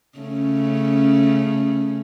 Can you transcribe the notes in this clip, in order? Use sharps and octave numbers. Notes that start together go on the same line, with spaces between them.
C#3 A3 C#4